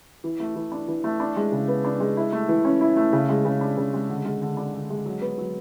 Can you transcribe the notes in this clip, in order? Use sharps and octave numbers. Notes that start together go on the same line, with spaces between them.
E3
A3
E3
D4
E3
A3
D4
G#3
C#3
B3
D4
G#3
E4
A3
E3
C#4
E4
A3
C#3
G#3
C#3
D4
C#3
G#3
D3
G#3
D3
D4
D3
G#3
F#3
B3
F#3